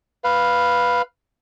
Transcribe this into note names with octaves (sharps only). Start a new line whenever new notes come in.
B4 F5